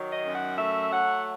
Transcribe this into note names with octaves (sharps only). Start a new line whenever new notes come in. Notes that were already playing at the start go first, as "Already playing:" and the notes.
Already playing: D#3 F#3
D#5
F#2
F#5
A3 E5
F#3 F#5